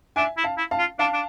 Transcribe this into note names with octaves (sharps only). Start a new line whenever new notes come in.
D4 E5 G#5
E4
F5 A5
E4
F5 A5
F4
D4 F5 A5
D4